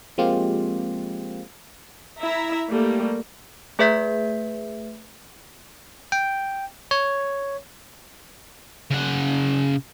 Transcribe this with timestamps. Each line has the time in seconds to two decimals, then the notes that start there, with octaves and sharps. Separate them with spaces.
0.18 F3 G#3 A#3 C4 F4 G4
2.21 E4 E5 A#5
2.68 G3 A3 A#3
3.79 A3 G#4 B4 E5 G6 B6
6.12 G5
6.91 C#5
8.91 C#3 F#5